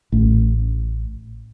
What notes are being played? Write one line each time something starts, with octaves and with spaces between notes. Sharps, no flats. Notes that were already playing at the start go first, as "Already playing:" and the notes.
A1